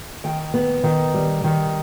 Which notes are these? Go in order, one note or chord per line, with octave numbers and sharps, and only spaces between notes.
D#3 G5
B3
D#3
G3
D#3